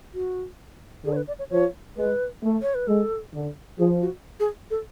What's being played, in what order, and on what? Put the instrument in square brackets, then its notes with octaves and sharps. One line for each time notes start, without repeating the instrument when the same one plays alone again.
[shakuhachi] F#4
[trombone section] D3 [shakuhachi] G#4
[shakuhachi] C#5
B4
D5
C#5
[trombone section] F3 [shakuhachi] C#5
[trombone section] G#3 [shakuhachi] B4
[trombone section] A3
[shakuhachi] C#5
B4
[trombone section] G#3 [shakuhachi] A4
[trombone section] D3
[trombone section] F3 [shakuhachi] G#4
[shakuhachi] F#4
G#4
A4